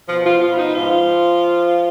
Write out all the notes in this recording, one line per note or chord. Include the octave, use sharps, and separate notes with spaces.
B2 F3 F4
F3 F4
B2
F3 F4
B3
D#4
G#2 F3 F4